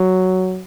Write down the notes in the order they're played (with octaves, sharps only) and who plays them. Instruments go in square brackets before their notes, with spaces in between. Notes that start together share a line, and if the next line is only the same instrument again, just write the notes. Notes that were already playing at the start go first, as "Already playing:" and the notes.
Already playing: [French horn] F#3